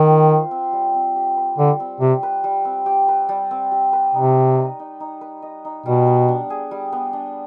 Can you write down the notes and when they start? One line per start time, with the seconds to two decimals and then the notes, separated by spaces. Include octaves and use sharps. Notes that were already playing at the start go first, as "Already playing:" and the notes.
Already playing: D#3 C4
0.09 F4
0.30 C5
0.51 C4
0.73 G3
0.94 C4
1.16 G4
1.37 B4
1.58 D3 G3
1.80 C4
2.00 C3 G4
2.23 B4
2.44 G3
2.65 C4
2.86 G4
3.08 B4
3.29 G3
3.51 C4
3.72 G4
3.93 B4
4.15 C3 D#4
4.37 B4
4.58 D#5
4.79 D#4
5.00 D#4
5.21 B4
5.42 D#5
5.65 D#4
5.86 B2 G3
6.07 B3
6.28 D4
6.50 G#4
6.71 G3
6.93 B3
7.13 D4